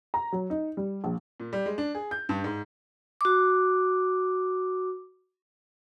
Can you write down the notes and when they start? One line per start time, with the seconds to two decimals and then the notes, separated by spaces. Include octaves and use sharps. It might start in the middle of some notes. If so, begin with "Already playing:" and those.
0.14 A#5
0.32 F#3
0.50 D#4
0.77 G3
1.04 A#1
1.40 A#2
1.53 G3
1.66 G#3
1.78 D4
1.95 G#4
2.11 G6
2.29 G2
2.44 G#2
3.21 F#4 D6